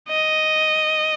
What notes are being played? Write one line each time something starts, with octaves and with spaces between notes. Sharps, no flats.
D#5